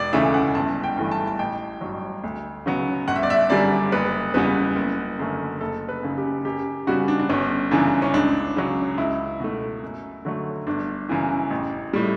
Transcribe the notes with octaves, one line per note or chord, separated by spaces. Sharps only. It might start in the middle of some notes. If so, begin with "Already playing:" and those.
Already playing: E1 D5
D2 C#3 E3 A3 E5
F#5
G1 A5
G5
G2 E3 A3
A5
A5
A1 G5
G2 F#3
D2
C#3 F#3 B3
G1 F#5
E5
D5
E5
F#2 D3 G3 D5
F#1 B4
E2 C#3 G3 B3 B4
F#1
F#2 D3 A3
F#1 A4
B4
F#2 C#3
G4
F#2 G4
C#3 G3 B3 F#4
D4
D4
G1 C#4
F#2 C#3 E3 D4
C#4
C#2 D4
C#3 F#3
C#2 E4
B2 A3
F#2
D3 F#3 A3
G1 D4
F#2 C#3 E3
A1
A2 G3